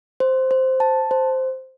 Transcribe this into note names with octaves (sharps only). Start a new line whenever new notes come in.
C5
C5
A5
C5